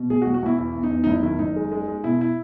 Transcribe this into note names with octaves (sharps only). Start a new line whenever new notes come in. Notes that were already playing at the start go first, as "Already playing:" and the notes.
Already playing: B2
B1 G#4
F#4
B1
F#4
B1 E4
E2 E4
E2
D#4
E2
D#4
F#1 E4
D#3 E4
F#1 D#4
G#3
G#3
G#3
B2 E4
E4